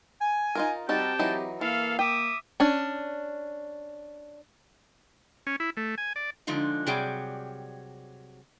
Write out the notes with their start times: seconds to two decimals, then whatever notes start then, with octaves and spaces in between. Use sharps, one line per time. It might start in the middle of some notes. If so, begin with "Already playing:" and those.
0.20 G#5
0.55 D#4 F4 A#4
0.89 G3 C4 D#4 F#4 G4 G5 A5
1.19 E3 F#3 D#4
1.61 E3 A#3 A4 F5
1.99 E5 G5 D6 D#6
2.60 C#4 D4
5.47 C#4
5.60 E4
5.77 A3
5.98 G#5
6.16 D5
6.47 D3 F3 G#3 D#4 F4
6.87 C3 F#3 G3 G#4 D5 G5